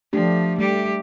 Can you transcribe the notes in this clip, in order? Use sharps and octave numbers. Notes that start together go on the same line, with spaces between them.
F3 A3 D4 G4
G3 A3 G4